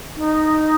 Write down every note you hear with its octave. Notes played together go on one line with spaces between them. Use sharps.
D#4